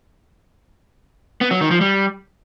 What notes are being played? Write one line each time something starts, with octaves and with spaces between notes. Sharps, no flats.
B3
F#3
D#3
F3
G3